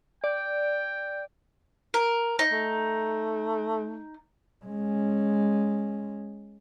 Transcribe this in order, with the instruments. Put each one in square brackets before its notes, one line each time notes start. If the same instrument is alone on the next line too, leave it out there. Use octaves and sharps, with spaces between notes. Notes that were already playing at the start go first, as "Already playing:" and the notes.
[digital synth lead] D5 [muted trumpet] G5
[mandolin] A#4
D#4
[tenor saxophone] A3
[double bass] G#3 C#4